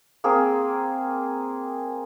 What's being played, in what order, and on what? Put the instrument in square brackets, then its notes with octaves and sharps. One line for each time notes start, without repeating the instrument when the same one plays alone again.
[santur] A#3 C4 G#4